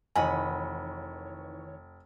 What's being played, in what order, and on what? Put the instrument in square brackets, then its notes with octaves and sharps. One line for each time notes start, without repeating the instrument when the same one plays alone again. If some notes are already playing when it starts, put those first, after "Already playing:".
[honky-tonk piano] F1 [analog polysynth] D#3 E3 C#5 [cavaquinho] D#5 F#5 B5 [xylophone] G#5